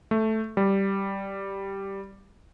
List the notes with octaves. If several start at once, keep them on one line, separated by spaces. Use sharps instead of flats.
A3
G3